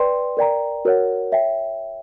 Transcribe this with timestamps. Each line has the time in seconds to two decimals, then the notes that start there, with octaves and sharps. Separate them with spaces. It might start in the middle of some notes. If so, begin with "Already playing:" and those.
Already playing: B4 D5 G5 C6
0.37 A#4 D5 G5 A#5
0.85 F#4 A#4 C#5 F#5
1.32 C#5 E5 G5